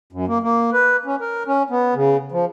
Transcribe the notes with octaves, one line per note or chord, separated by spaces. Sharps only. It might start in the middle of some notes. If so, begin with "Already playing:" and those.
F#2
A#3
A#3
B4
C#4
A#4
C#4
B3
C#3
F3